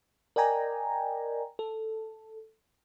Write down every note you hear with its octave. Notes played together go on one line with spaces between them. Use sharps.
A#4 D5 D#5 G5 G#5 A#5
A4